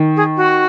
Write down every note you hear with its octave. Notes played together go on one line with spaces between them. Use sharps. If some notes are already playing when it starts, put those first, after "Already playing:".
Already playing: D#3
G#4
F#4